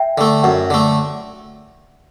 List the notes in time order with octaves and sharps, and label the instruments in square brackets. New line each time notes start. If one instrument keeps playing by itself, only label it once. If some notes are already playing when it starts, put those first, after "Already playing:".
Already playing: [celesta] E5 G5
[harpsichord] D3 A3
[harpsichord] F#2 [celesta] F#5
[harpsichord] D3 A3